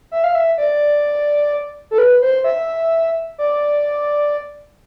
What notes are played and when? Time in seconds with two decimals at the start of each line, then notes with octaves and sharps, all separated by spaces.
0.11 E5
0.24 F5
0.35 E5
0.58 D5
1.91 A4
1.98 B4
2.22 C5
2.44 E5
3.38 D5